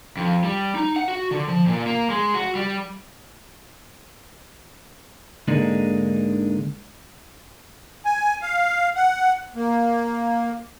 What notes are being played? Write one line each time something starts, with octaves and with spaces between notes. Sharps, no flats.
F2
G3
D#4
F#5
F#4
D3
F3
A#2
A#3
G#3
F#4
G3
G#2 D3 G#3 A#3 D4 D#4
G#5
F5
F#5
A#3